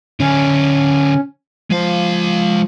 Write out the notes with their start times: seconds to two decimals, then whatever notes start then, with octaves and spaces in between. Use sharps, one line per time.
0.20 D3 C#4 E4
1.71 F3 G#3 F5